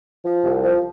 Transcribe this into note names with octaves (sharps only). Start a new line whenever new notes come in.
F3
C2
F3